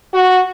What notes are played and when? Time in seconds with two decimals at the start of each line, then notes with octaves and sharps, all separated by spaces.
0.14 F#4